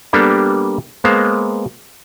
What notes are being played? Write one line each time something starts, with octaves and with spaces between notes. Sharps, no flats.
G3 A#3 B3 D4 G4 A4
G#3 A#3 B3 C5 F5